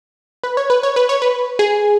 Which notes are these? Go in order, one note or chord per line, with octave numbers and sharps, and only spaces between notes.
B4
C#5
B4
C#5
B4
C#5
B4
G#4